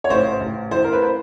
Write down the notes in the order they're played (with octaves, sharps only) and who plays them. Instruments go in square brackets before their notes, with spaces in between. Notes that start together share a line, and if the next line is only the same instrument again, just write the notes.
[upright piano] C#5
A1 C5
A1
E3 C5
A#4
B4
C5